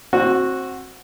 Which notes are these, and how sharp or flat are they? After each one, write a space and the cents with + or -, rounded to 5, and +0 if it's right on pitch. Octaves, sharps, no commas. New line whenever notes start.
C4 +25 F#4 -5